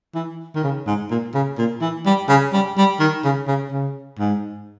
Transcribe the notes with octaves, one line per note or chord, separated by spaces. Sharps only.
E3
D#3
C#3
G#2
A#2
C#3
A#2
E3
G3
C#3
G3
G3
D#3
C#3
C#3
C#3
G#2